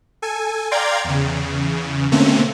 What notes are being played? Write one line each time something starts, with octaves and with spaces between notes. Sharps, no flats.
A4 G#5
D5 F5 G5 A#5 C6 G#6
E2 C#3
B2 D3 A3 A#3 C4 C#4